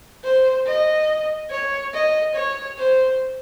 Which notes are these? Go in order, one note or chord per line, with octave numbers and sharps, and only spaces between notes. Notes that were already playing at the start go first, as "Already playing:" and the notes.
C5
D#5
C#5
D#5
C#5
C5